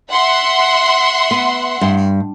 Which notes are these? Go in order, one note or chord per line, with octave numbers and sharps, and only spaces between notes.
E5 F#5 C6
B3
G2